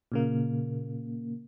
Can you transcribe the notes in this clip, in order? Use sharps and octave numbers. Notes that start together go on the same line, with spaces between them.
A#2 C#3 A#3